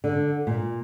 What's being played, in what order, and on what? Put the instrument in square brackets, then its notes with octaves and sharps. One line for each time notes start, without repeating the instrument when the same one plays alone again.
[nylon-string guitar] D3
A#2